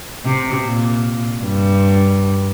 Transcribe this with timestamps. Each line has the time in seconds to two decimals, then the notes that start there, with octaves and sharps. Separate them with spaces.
0.25 C3
0.65 A#2
1.44 G2